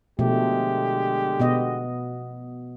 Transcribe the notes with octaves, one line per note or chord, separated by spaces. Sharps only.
B2 D3 F3 G#3 A3 G4
B2 B3 D#5